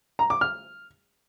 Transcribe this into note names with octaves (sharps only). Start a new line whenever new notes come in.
A#5
D6
F6